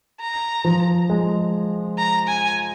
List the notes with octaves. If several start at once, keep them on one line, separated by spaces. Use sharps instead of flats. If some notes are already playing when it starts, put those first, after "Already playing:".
A#5
F3
G#3
A#5
G#5